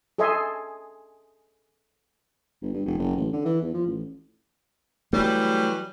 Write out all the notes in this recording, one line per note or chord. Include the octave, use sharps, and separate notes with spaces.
G#4 A4 D#5 E5 G#5 C6
G1
G2
F1
F#1
A1
D3
E3
E2
F3
A1
E3 F#3 G3 A3